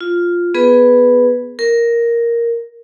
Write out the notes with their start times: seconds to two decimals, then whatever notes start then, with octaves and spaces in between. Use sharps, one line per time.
0.01 F4
0.54 B3 G#4 B4
1.59 A#4